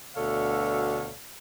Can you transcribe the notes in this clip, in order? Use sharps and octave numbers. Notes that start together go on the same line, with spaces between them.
D2 B2 A4 C#5 D5 F5